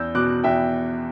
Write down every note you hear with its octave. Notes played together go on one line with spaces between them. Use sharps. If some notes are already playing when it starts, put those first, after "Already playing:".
Already playing: E2 E6 G6
B2 D6 F#6
E2 E5 G5